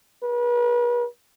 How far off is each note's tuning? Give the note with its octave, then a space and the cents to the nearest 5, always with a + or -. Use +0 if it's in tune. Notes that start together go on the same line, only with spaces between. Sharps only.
B4 -40